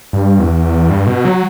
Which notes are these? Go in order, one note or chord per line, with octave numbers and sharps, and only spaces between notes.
G2
E2
G2
B2
F#3